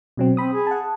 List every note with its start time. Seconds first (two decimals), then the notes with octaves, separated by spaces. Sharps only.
0.17 B2 F#3 C4
0.37 C4 B5 D#6
0.53 G#4
0.67 F#5 A5